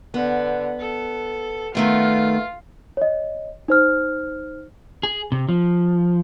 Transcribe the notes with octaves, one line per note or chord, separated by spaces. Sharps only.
D3 B3
A4
D#3 A3 B3 F4
C#5 D#5
D#4 C5 F6
G#4
C3
F3